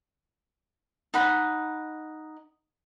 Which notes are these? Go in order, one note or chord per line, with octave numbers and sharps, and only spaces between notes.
D#4 F#5 B5